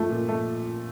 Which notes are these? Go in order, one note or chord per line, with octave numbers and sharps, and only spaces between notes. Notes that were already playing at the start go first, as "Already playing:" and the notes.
Already playing: F3 A3
A#2
F3 A3